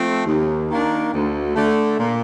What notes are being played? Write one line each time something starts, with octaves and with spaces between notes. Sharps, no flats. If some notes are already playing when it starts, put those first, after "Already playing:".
Already playing: F3 A3 C4
D#2
D#3 A#3 D4
D2
D3 A3
A#2